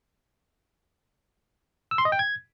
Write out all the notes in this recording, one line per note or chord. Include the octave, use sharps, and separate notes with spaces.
E6
C6
D#5
G5
G#6